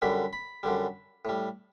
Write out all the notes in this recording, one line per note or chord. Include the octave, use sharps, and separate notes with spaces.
F#2 D3 G3 B5
B5
F#2 D3 G3
A2 G3